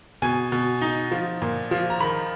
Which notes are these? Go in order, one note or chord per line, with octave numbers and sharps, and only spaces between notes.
B2 G#5
B2
D#4
F3
A#2
F3
A#5
D#3 B5